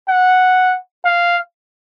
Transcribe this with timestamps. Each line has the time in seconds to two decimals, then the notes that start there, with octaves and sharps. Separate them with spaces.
0.09 F#5
1.05 F5